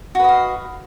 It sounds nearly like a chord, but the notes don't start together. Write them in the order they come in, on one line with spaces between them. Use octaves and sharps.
F#4 B4 D#5 F5